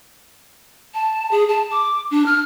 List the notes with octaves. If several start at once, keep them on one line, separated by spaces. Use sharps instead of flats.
A5
G#4
A5
D6
D4
F6